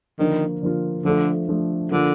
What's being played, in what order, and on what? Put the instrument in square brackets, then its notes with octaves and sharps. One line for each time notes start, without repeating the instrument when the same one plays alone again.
[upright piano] D3 F3 A#3 F4 [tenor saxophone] D#3
[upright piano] D3 F3 A#3 F4
[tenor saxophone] D3 [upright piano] F3 A3 D4 A4
[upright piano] F3 A3 D4 A4
[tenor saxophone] D3 [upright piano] F3 A#3 F4 A4